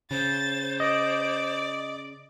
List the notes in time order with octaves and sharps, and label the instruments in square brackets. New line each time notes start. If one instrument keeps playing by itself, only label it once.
[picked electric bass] C#3 [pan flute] C5 [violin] A6
[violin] D5 [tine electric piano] D#5